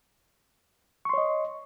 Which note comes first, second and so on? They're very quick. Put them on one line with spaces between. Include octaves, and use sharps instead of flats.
C#6 C6 C#5 D#5